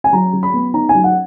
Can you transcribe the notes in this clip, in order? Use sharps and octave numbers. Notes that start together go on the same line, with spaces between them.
G#5
F#3 A#5
F#3
B5
B3
D#4 A#5
G#5
F#3
F#5